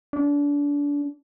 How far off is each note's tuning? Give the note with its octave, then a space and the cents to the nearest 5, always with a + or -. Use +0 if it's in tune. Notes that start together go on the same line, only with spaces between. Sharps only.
D4 -30